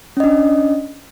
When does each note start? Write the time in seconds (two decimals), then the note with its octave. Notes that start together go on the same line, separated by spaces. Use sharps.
0.17 C#4
0.20 D#5
0.24 D4